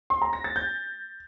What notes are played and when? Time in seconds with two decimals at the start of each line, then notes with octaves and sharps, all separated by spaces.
0.10 C6
0.22 A#5
0.33 A#6
0.44 A6
0.56 G6